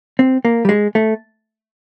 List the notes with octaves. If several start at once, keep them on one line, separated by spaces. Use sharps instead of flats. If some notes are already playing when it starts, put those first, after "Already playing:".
C4
A#3
G3
G#3
A3